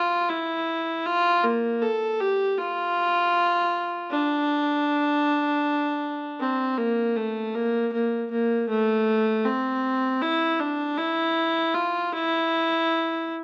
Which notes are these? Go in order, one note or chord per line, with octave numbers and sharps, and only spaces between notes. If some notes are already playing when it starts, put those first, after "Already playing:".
Already playing: F4
E4
F4
A#3
A4
G4
F4
D4
C4
A#3
A3
A#3
A#3
A#3
A3
C4
E4
D4
E4
F4
E4